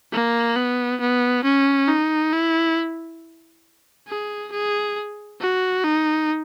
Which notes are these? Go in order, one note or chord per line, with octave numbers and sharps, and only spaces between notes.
A#3
B3
B3
C#4
D#4
E4
G#4
G#4
F#4
D#4